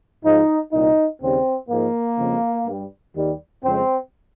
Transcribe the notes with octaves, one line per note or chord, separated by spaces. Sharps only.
G#2 F3 G#3 D#4
C2 A#2 G3 D#4
D#2 C#3 G3 C4
G#2 F3 G#3 A#3
F2 C#3 F3 G#3
G2 G3
D#2 D#3 G3
F2 C#3 G#3 C4